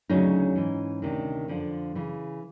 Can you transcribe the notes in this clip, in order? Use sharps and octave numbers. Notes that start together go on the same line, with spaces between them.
D2 C#3 F#3 C#4 D#4
G#2 E3
D2 C3 D#3
F2 D3 F3
C#3 E3